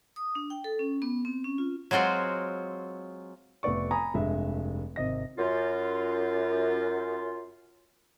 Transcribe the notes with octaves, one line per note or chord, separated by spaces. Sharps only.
D#6
D4
G5
A4
C#4
B3
C4
C#4
F4
F#3 G#3 C4 F4 F#4
F1 A3 B3 D5 C#6
G#5 A#5 B5 D#6
F1 G2 G#3 E5
G#1 C3 D#5 A#6
F#2 F4